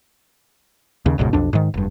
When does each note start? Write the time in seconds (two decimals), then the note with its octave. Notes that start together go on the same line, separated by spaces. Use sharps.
1.06 D#2 C#3
1.18 F1 C#2 G#2 B2
1.33 B1 F2 D4
1.53 G#2 D#3
1.74 F1 G2